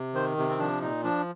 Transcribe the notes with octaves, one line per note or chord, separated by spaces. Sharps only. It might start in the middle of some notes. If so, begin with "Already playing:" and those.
Already playing: C3
D#3 C5
C3
C4
F3 D4
A#2 D#4
F3 D4